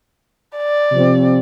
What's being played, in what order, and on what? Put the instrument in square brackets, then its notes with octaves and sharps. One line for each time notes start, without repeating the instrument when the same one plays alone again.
[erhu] D5
[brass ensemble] C3 F3 C4